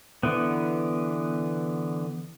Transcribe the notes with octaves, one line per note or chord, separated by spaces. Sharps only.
D3 E3 B3